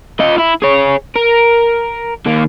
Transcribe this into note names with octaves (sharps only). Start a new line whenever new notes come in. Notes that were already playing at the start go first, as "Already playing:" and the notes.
F4 D#5
E4
G#4 C#5
A#4
D#2 A#3